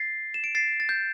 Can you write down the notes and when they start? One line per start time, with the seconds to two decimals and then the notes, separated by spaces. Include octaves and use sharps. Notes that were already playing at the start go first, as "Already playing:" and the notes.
Already playing: A6 C7
0.34 E7
0.44 D7
0.55 A6 C7
0.80 A6
0.89 G6